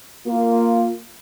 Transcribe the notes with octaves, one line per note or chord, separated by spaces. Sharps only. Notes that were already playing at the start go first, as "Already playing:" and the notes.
A#3 F4